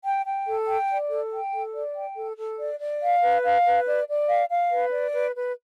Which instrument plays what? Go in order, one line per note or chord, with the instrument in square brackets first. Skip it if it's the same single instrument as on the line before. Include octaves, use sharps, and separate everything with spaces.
[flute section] G5
G5
A4
G5
D5
A4
G5
A4
D5
G5
A4
A4
D5
D5
F5
B4
F5
B4
D5
D5
F5
F5
B4
D5
B4
B4